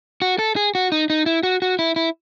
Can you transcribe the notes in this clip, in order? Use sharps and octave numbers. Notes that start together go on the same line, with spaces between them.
F#4
A4
G#4
F#4
D#4
D#4
E4
F#4
F#4
E4
E4